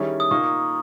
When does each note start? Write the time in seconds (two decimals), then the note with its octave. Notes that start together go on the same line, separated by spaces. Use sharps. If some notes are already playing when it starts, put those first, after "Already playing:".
Already playing: D#3 G3 C#4 E4 G#4
0.20 D#6
0.31 A#2 A#3 D#4 C#6